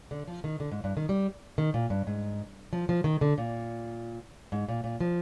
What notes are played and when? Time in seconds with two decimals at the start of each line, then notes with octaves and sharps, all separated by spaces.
0.11 D3
0.28 F3
0.44 D#3
0.60 D3
0.71 G#2
0.84 G2
0.97 D#3
1.09 G3
1.58 D#3
1.74 A#2
1.90 G2
2.07 G#2
2.73 F3
2.89 F3
3.04 D#3
3.21 D3
3.38 A#2
4.52 G#2
4.68 A#2
4.84 A#2
5.00 F3